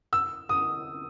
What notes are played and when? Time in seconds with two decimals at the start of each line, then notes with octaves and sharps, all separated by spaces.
0.13 E6
0.49 D#6